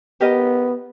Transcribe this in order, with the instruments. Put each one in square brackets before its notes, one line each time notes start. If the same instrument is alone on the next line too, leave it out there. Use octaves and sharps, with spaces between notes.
[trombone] B3 [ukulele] G4 A#4 D#5